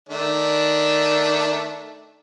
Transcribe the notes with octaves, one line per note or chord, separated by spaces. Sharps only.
D#3 A3 D4